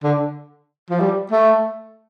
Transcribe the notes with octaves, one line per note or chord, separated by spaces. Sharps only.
D3
F3
G3
A3